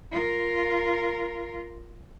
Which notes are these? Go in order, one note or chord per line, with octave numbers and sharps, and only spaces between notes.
F4 A#4